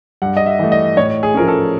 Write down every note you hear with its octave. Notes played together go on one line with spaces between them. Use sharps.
G2 F#5
D#5
E5
E3 A3
D#5
A2 C#5
G#4
F3 A3 C#4 A#4
A4